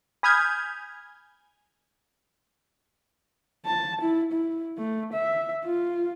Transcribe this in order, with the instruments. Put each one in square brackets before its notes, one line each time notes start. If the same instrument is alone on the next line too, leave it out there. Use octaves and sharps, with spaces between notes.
[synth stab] G#5 B5 D#6 F6 G6 G#6
[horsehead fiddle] A5
E4
E4
A3
E5
F4